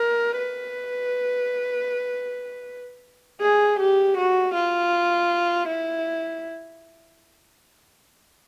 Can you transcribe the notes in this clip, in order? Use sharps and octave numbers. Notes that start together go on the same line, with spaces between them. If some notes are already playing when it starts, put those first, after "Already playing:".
Already playing: A#4
B4
G#4
G4
F#4
F4
E4